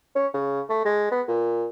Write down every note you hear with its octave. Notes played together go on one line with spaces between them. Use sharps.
C#4
C#3
A3
G#3
B3
A#2